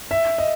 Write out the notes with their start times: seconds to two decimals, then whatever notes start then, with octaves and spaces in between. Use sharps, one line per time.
0.11 E5
0.38 D#5